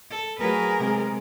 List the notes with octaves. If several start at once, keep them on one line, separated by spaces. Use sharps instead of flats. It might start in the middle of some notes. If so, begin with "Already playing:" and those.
A4
F#3 A3 G#4 A#4 B4
C3 G#3